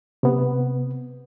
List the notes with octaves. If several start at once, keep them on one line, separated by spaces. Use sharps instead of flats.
C3 B3